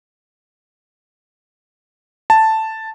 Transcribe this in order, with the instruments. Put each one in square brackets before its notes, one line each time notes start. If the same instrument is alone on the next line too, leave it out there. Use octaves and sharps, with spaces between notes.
[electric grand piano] A5